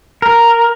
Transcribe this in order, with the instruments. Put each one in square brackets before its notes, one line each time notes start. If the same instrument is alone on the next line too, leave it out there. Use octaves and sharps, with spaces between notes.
[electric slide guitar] A#4